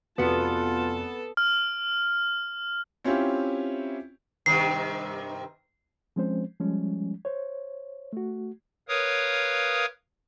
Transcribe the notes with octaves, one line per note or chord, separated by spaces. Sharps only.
F1 B3 F4 F#4 A4 A5 C#7
F6
C4 C#4 E4 F4 G4
G2 C3 D#3 C7
F3 G#3 C4 C#4 C5
F3 G3 G#3 C#4
C5 C#5
A3 F#4
A#4 B4 C#5 F5 D#6